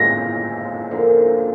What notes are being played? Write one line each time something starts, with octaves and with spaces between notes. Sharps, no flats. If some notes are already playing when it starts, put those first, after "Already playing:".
Already playing: A#2 F3 G#3 A#6
D3 F3 A#3